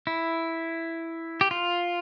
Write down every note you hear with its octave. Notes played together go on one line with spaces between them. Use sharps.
E4
G4
F4